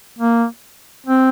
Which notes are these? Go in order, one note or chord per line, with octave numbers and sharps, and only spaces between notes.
A#3
C4